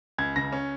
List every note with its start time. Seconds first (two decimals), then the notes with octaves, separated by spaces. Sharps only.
0.18 C#2 G#6
0.36 C#3 A#6
0.52 C#4